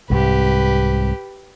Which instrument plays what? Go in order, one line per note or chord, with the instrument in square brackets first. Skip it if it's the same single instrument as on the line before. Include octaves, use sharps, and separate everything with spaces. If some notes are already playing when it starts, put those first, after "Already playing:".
[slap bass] C2 G#2 C3 [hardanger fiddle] G4 B4